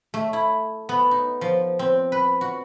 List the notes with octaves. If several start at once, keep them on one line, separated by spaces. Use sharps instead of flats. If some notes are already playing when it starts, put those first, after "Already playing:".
A3
E4
B3
D#4
F3
C4
B4
F#4